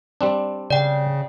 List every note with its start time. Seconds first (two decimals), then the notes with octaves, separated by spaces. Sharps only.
0.21 G3 C4 D4
0.70 C#3 D5 G5